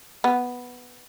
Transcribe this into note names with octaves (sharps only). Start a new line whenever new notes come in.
B3